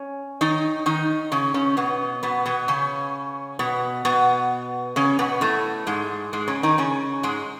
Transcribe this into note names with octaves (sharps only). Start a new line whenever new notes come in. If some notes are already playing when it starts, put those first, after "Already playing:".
Already playing: C#4
D#3 D#4
D#3 D#4
C#3 C#4
C#3 C#4
B2 B3
B2 B3
B2 B3
C#3 C#4
B2 B3
B2 B3
C#3 C#4
B2 B3
A2 A3
G#2 G#3
G#2 G#3
C#3 C#4
D#3 D#4
C#3 C#4
G#2 G#3